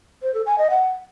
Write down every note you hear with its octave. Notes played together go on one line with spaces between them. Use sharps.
C5
A4
G#5
D#5
F#5